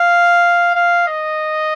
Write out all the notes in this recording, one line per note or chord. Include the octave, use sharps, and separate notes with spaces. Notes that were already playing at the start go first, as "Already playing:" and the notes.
Already playing: F5
F5
D#5